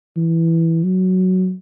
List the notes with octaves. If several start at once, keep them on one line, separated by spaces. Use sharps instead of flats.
E3
F#3